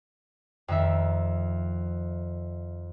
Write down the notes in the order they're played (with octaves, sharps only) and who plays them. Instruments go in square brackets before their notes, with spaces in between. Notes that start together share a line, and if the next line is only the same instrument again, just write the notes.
[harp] F2 D#3 E5